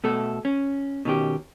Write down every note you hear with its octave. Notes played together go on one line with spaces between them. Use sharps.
B2 A3 A4
C#4
B2 D#3 C#4 G4